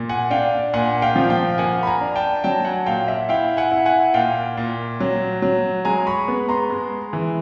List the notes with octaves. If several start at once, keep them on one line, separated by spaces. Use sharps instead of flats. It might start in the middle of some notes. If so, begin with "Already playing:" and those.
Already playing: A#2
F#5 G#5
D4 F5 G5
A#2 F#5 G#5
F5 G5
F3
F5 G5
A#3 F#5 G#5
B5
G#5 A#5
D4
G5 A5
F#3 G5 A5
F#5 G#5
A#2 F5 G5
E5 F#5
E4 F5 G5
F#5 G#5
E4
F#5 G#5
A#2 F5 G5
A#2
F#3
F#3
G#3 G#5 A#5
B5 C#6
B3
A#5 C6
G#3
E3